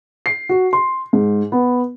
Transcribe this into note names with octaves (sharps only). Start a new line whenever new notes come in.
C7
F#4
C6
G#2
B3